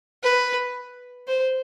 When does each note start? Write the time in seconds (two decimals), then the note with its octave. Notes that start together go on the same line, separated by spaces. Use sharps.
0.23 B4
1.27 C5